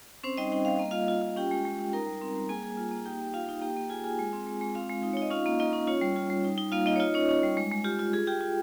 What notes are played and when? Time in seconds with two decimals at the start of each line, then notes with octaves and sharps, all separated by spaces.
0.24 C4 C#4 C5
0.37 G3 D#4 D#5
0.52 C#4 G5
0.65 G3 F5
0.79 A#3 D#5
0.91 A#3 F4 F5
1.08 F4
1.22 F4
1.36 C#4 G4 G5
1.51 G#3
1.65 G#3
1.79 C#4
1.93 D#4 A#4 A#5
2.07 G3
2.22 C4
2.36 G3
2.49 A#3 G#4 G#5
2.63 A#3 G#4 G#5
2.77 F4
2.91 A#3
3.05 D#4 G4 G5
3.20 A#3
3.33 D#4 F4 F5
3.49 D#4
3.61 A#3 G4 G5
3.77 A#3
3.90 F4 G#4 G#5
4.04 F4 G#4 G#5
4.19 G#3
4.33 C4
4.47 G#3
4.61 G#3
4.75 C4 F4 F5
4.89 G#3
5.03 D#4
5.13 D#4 C#5
5.22 D#5
5.31 C#4 F4 F5
5.46 A#3
5.59 A#3 D#4 D#5
5.73 C#4
5.87 C#4 F4 C#5
6.01 G3
6.16 F4
6.30 G3
6.44 D#4
6.58 D#4
6.72 A#3 F4 F5
6.86 A#3 D#4 D#5
6.96 C#5
7.00 D#4 F4 D#5
7.14 C#4 C#5
7.29 C#4
7.43 G3
7.57 G#3
7.71 G#3
7.84 F4 G4
7.99 F4
8.13 F4 G#4
8.27 F4 G4 G5
8.41 F4